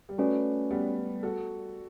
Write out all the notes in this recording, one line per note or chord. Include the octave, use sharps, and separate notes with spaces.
G3
A3 C#4 F#4 B4 D5
G3 B3
F#4 A4